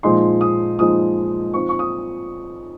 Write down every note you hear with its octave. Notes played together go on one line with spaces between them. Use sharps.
A#2 F3 G#3 D#4 C6
D#6
A#2 F3 G#3 D#4 D#6
F3 C4 D#4 C#6
C#6
D#6